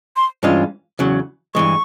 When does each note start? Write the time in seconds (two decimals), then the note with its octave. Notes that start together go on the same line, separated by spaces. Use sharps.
0.17 C6
0.43 G2 E3 G#3 C#4 F4
0.99 E2 C#3 F#3
1.55 G2 E3 G#3 C#6